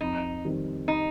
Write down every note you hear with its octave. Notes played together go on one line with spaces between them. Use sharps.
F2 D#4
D#3 G3 C4
D#4